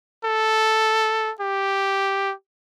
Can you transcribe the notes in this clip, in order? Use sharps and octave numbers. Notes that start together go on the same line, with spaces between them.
A4
G4